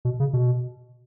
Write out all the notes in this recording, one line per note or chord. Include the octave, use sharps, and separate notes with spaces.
B2
C#3
B2